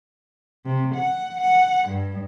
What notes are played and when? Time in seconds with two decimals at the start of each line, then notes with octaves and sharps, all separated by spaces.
0.65 C3
0.96 F#5
1.40 F#5
1.89 G2